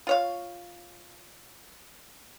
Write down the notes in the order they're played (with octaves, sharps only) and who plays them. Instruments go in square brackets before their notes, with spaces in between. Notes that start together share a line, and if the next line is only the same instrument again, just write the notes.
[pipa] F4 C#5 F5